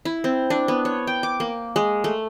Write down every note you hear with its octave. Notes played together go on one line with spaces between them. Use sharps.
E4
C4
D4
B3
C#5
G5
D6
A#3
G#3
A3